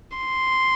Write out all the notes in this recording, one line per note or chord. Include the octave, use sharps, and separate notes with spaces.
C6